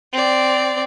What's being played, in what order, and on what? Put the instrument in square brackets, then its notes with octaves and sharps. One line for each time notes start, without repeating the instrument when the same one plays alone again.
[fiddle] C4 D5